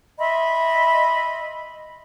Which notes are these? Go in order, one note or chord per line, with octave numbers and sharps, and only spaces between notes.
D#5 E5 B5 C6